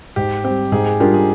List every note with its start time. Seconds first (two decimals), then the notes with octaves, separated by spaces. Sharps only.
0.16 G#2 G4
0.44 G3 C4 G4
0.72 G#2 G#4
0.86 G#4
1.00 G3 D4 F4 G4 A#4
1.14 G#4